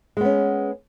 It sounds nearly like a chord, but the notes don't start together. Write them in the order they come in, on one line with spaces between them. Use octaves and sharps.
G#3 B3 C#4